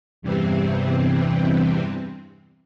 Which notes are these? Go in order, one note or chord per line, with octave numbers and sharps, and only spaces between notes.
E2 G2 C3 E3 C4